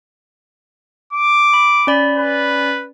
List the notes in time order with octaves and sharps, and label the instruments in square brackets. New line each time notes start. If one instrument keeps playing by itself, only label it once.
[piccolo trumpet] D6
[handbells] B5
C#4 D5 B5
[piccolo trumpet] B4